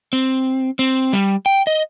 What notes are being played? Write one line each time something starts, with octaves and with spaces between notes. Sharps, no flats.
C4
C4
G3
G5
D#5